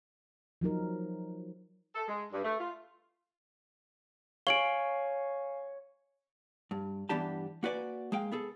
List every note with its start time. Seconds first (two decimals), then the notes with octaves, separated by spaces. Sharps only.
0.61 F3 F#3 D#4 A#4
1.95 A4
2.08 G#3
2.32 G2
2.44 A3
2.60 F4
4.47 C#5 F5 G#5 D7 F#7 G7
6.71 G2
7.09 G2 E3 B3 D4 G4 A5
7.63 A#3 F#4 B4 D5 G#5
8.12 G#3 A#3 F5 G5
8.32 B3 G#4 A4